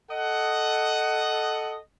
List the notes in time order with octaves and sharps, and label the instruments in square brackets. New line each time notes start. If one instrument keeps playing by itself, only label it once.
[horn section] A4 D#5 F#5